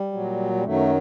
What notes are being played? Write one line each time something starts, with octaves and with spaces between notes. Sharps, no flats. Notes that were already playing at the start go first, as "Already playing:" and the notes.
Already playing: G3
A#2 F#3
G3
F#2 D#3 F#3 A3